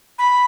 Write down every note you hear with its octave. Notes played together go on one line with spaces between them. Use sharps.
B5